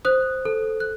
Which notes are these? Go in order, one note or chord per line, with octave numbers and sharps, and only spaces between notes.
C5 D#6 F#6
A4
F#6